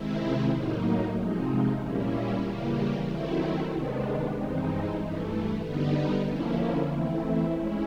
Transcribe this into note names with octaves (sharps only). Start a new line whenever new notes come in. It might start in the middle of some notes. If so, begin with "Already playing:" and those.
Already playing: C3 D#3 G#3 C4 E4
A2 F#3 A#3 D#4
C3 F3 G#3 C4 D#4
A#2 G3 A#3 C#4 E4
C#3 E3 G3 A#3
D#3 F#3 A3 C4 E4
C3 D#3 G#3 B3 D4
G2 E3 G#3 C4 D#4
G2 E3 A3
D3 G3 B3 D#4
D3 F3 A#3 C#4 E4
E3 A3 C4 E4
G#3 C#4 E4